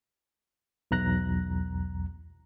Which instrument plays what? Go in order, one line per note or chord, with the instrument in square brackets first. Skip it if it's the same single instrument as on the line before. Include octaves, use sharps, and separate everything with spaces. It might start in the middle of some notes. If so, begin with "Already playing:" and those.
[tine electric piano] B1 E2 A#5 F#6 A#6